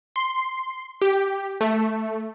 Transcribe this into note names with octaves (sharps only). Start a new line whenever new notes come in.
C6
G4
A3